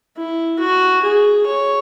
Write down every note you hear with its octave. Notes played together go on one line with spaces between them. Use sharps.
E4
F#4
G#4
C#5